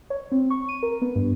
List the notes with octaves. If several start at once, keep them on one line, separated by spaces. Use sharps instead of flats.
C#5
C4
C#6
D#7
A#4
B3
G2